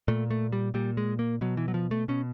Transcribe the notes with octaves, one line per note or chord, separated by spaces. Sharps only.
A#2 A3
A3
G3
A#2 G3
G#3
A#3
B2 F#3
E3
F#3
F3
A3
B2 C#4